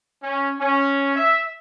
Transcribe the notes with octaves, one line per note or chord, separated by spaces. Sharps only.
C#4
C#4
E5